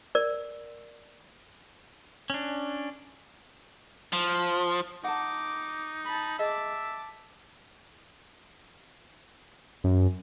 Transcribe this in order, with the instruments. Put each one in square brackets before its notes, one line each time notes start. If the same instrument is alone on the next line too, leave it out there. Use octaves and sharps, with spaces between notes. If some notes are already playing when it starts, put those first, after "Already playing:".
[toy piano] A#4 D5
[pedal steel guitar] C#4 D4
[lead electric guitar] F3
[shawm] D#4 [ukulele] F#5 A5 [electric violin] D6
[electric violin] A5 B5
[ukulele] G#4 D#5 [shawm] E5 [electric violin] A5 D6
[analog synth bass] F#2